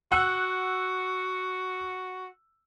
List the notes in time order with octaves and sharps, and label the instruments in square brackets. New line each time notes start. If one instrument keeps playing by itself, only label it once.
[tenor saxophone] F#4 [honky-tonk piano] F#5 E6 F#6